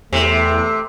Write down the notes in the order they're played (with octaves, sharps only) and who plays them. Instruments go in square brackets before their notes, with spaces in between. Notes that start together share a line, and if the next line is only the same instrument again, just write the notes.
[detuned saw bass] E2 [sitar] C3 [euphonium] A3